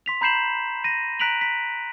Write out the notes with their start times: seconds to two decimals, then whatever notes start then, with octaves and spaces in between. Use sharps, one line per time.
0.06 C6 B6 F7
0.21 A#5 B5 G6 C7 E7 F#7
0.84 A#6 D#7
1.20 A#5 F#6 B6 D7 F7 F#7
1.41 B6